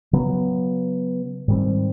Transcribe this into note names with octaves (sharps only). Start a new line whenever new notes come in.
C#3 F#3 B3
G#2 D#3 G3 C4